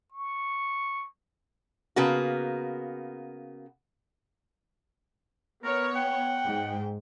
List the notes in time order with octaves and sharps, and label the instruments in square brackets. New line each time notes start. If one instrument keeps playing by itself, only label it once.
[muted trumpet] C#6
[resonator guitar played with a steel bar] C#3 A#3 B3 F#4
[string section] B3 C#5 [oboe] A#4
[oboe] F#5 [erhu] G5
[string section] G#2